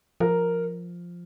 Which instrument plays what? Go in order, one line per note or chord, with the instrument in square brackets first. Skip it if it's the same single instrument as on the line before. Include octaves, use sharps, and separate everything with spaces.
[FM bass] F3 [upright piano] A#4